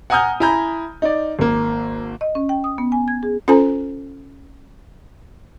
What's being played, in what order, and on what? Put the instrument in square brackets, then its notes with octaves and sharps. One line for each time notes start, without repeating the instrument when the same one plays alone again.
[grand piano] F#5 G#5 A#5 D#6 F6 G6
E4 G#5 A#5 B5 G6
D#4 D5
G#1 A#3
[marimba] D#5
C#4
G5
D#6
B3
G#5
G#6
G#4
[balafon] C#4 F4 A4 C5 G#5 A#5